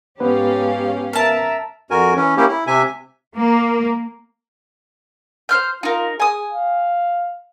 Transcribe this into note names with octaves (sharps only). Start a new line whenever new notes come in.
G#2 B3 C#4 G4 B4 F5
A#4 E5 A5
F2 F#4 A#4 G#5
E3 C#4
A#3 C#4 E4 G4
E4
C3 E5 G#5
A#3
C5 F6 G6
D#4 F4 A#4
G#4 G#5 D#6
F5